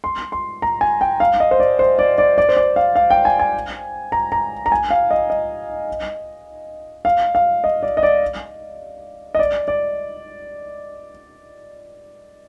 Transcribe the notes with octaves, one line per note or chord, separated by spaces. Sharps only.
C6
C6
A#5
G#5
G5
F5
D#5
C5
D5
C5
D5
D5
D5
C5
D5
F5
F5
G5
G#5
G#5
A#5
A#5
A#5
G#5
F5
D#5
D#5
F5
F5
D#5
D5
D#5
D5
D#5
D5
D5